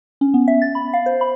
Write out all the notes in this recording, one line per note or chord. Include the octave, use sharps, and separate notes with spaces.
C#4
B3
E5
A6
B5
F5
C5
B5